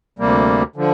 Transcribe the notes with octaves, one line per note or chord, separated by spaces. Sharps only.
D2 C3 G3 A#3
D3 F3